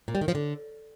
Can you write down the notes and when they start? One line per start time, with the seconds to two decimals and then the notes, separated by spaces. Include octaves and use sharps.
0.08 A#2
0.15 G3
0.21 D#3
0.28 F3
0.35 D3